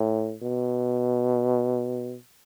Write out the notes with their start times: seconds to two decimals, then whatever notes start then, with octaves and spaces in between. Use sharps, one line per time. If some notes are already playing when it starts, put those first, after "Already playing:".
Already playing: A2
0.42 B2